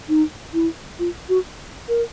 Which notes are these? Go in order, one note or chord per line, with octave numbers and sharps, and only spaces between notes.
D#4
E4
F4
F#4
A#4